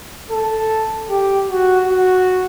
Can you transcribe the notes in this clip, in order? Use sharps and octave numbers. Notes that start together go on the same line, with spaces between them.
A4
G4
F#4
F#4